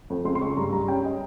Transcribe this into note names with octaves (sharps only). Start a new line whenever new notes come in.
F2
C#2 C6
C6
C#2 C#6
G2 A#5
G2 A#5
C#4 G5
D#5